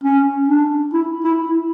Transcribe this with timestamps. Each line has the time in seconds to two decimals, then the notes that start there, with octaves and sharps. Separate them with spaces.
0.03 C#4
0.48 D4
0.93 E4
1.24 E4